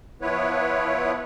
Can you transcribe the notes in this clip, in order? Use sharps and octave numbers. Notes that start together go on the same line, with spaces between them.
F3 B3 E4 B4 C#5